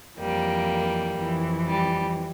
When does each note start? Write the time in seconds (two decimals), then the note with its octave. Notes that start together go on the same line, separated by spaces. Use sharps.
0.18 F2 E3 G3 A#3
1.17 F2 E3
1.67 G3